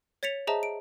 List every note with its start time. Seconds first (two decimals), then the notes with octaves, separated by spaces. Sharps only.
0.23 C#5 A6 B6 C#7 F7
0.47 G#4 C5 D#5 E5 A5 A#5
0.63 D7